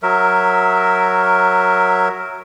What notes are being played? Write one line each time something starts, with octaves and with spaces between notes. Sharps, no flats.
F#3 A#4 E5